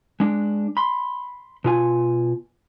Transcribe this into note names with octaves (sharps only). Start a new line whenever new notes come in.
G#3 D4
B5 C6
B2 F4 G#5